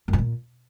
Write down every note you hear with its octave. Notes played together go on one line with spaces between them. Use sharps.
F#2
G#2
A#2